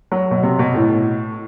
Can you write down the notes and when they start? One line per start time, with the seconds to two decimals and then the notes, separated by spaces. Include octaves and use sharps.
0.12 F#3
0.31 B2
0.43 C3
0.59 B2
0.75 A2